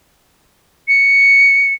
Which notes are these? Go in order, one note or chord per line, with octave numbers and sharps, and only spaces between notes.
C#7